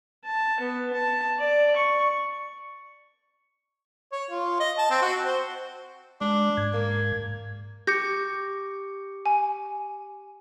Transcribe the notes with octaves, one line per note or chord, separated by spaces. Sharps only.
A5
B3
A5
D5
C#6
C#5
F4
D#5
A5
C4
F#4
C5
G#3 D4
G#2 G#6
A#3
G4 D6 G6 A#6 C#7
G#5